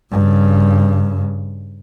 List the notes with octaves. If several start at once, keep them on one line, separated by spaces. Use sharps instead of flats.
G2 C#3